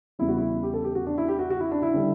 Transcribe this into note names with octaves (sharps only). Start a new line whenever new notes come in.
E2 C#3 G3 E4
F#4
E4
G4
A4
G4
F#4
D4
E4
G4
F#4
F#4
E4
D4
E4
D3 G3